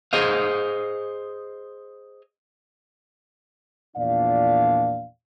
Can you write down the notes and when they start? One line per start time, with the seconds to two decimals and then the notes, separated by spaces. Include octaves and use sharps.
0.13 G#4 C5 D#5 F5
3.97 E2 A#2 F3 D4 D5 F5